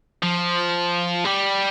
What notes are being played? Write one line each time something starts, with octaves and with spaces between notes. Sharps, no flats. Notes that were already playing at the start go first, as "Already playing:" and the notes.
F3
G3